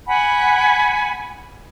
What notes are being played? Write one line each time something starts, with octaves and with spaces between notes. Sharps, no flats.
F#5 G#5 B5